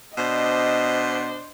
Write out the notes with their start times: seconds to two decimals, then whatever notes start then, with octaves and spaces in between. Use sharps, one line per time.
0.17 B2 D4 C5 D#5